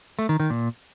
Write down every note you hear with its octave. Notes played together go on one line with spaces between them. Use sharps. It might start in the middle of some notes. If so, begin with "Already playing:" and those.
A3
D#3
D#3
A#2